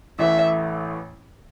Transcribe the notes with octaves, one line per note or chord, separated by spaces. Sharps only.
A1 A2 E3 A3 E5